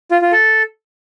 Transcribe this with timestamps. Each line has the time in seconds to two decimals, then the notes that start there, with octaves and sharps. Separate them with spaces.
0.11 F4
0.22 F4
0.32 A4